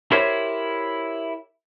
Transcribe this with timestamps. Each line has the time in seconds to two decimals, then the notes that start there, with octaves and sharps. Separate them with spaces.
0.12 E4 G4 A#4 C5 C#5 E5